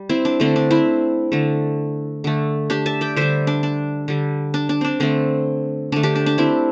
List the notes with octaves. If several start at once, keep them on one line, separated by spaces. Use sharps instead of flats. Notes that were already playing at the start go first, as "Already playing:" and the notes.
Already playing: G3
C4 E4
D4
D3 A3 C4
D4
C4 E4
D3 A3
D3 A3
D4 G4
E5 A5
D5 G5
D3 G3 C5 E5
D4
D4
D3 G3
D4
D4
C4 D4
D3 A3 C4
D3 A3 D4
D4 G4
D4
D4
C4 E4